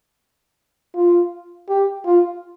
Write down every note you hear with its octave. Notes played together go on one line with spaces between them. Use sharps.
F4
G4
F4